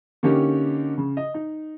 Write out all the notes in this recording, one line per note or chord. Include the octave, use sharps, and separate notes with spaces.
D3 A#3 C#4 D#4 G4
C#3
D#5
D#4